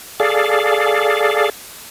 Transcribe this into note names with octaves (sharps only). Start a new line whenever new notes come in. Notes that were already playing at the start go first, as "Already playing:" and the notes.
G#4 A4 D5 F5